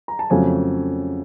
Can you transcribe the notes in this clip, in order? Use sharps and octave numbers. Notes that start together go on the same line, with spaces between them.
A#5
A5
F2 C#3 F#3 A3 C#4 G#5